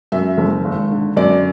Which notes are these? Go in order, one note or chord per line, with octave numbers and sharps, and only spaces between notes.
F#2 E5
F#1
G#1
D3
F#2 D5